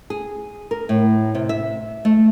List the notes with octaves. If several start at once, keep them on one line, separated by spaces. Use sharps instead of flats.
G#4
A#4
A2
C3
E5
A3